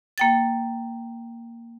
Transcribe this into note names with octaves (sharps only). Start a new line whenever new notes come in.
A#3 G5 A6